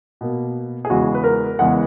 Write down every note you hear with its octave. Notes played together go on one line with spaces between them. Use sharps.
B2 A#3
G#4
E2 C#3 E3 G#3 F#4
B4
A#4
E2 C#3 E3 G#3 F#5